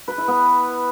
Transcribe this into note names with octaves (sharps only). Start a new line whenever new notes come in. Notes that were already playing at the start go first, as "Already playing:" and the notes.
B4
E4
B3